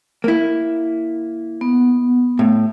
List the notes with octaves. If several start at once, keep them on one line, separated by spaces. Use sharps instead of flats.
A#3 E4
B3
A2